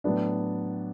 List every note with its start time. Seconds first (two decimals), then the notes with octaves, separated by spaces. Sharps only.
0.04 A2 F#3 B3 D4 D5